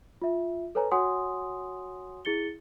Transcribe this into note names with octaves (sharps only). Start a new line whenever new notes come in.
F4 E5
A4 B4 C#5 G#5 A#5
F#4 C#5 F#5 G#5 C6 D#6
E4 G#4 A6 C#7 G7